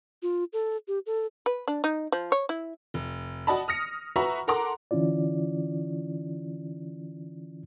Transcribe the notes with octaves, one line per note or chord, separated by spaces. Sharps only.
F4
A4
G4
A4
B4
D4
D#4
F3
C#5
E4
F1
F#4 D5 D#5 A5 B5
D#6 F6 A#6 C#7
F#4 B4 E5 A#5 C#6
A4 A#4 F#5 A#5 C6 D6
D3 E3 C#4 E4 F4 D5